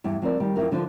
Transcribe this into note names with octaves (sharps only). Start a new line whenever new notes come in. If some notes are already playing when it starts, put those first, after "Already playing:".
E2 G2
F3 C4 A#4 D5
D#3 G3
F2 C4 E4 F#4 A#4
D3 F3 D4 F4 C5